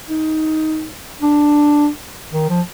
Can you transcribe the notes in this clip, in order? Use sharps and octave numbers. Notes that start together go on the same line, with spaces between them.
D#4
D4
D#3
F3